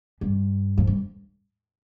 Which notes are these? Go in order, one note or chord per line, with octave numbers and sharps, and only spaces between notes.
G2
F2
G2